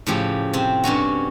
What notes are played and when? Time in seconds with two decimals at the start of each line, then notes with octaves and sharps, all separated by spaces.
0.07 A2 C#3 F3 G4
0.53 C3 C4
0.84 G2 C3 C#4 F#4